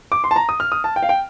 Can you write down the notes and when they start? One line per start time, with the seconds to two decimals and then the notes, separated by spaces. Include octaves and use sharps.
0.12 D6
0.24 C6
0.31 A5
0.36 A#5
0.49 D#6
0.60 F6
0.72 D#6
0.84 A5
0.96 G5
1.03 F5
1.09 G5